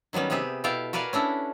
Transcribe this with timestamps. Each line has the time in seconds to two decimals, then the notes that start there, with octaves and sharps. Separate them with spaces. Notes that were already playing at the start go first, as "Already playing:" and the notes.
0.13 D#3 F#3 G3 B3 C#4
0.30 C3 B3 G4 G#4 E5
0.64 B2 E4 A4 F5 G5 A5
0.93 F#4 A#4 B4 D5 F5 G#5
1.13 C#4 D4 E4 A4